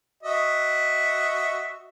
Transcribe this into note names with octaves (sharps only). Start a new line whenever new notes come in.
F#4 D#5 E5